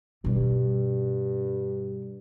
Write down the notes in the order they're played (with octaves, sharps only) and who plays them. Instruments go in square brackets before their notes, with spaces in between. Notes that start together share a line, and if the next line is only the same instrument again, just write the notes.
[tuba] G2 [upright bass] B2 G3